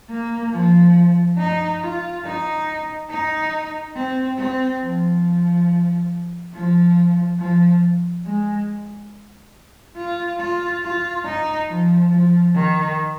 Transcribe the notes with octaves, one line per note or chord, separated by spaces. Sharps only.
A#3
F3
D#4
F4
D#4
D#4
C4
C4
F3
F3
F3
G#3
F4
F4
F4
D#4
F3
F3
D#3